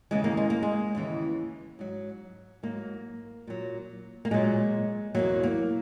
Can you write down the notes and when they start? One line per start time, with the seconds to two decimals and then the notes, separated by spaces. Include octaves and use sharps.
0.11 D#2 C#3 E3 G#3
0.24 A#3
0.37 G#3
0.50 A#3
0.63 G#3
0.95 D#2 C#3 E3
1.79 G#2 F#3
2.63 G#2 F#3 A#3
3.47 A#2 F#3
4.25 A#3
4.31 A#2 F#3 G#3
5.15 E2 B2 F#3 A#3
5.43 A#3